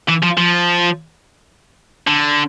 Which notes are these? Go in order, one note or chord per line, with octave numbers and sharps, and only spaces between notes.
E3
F3
F3
D3